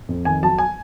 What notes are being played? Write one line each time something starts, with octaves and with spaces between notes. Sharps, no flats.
F2
D#3 G#5
F#3 A5
G#5